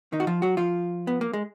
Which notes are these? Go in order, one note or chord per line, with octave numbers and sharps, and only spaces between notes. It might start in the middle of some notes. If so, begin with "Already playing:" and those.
D#3 D#4
F#4
F3 F4
F#3 F#4
F3 F4
B3
A#3
G#3